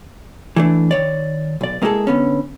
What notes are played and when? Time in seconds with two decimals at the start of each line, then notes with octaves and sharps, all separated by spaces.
0.56 E3 A3 D4
0.91 D#3 C#5 D5
1.61 B1 D5
1.82 G#3 A#3 E4 F#4 G#4 A4
2.07 D3 B3 C#4